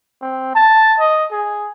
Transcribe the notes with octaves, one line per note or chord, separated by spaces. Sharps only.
C4
A5
D#5
G#4